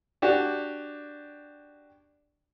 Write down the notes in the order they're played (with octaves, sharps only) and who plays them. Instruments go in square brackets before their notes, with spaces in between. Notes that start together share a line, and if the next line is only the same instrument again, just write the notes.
[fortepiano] D4 F#4 G4